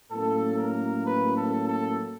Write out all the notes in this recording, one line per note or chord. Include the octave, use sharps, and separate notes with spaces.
A2 F#3 A#3 C#4 A4
A#4
B4
A4
A4